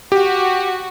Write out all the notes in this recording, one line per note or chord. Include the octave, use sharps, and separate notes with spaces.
F#4 G4